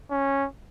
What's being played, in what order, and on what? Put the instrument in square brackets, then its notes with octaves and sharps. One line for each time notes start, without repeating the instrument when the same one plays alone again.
[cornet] C#4